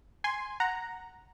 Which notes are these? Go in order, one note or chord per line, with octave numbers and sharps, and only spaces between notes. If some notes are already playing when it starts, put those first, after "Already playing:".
G#5 C6
F#5 A#5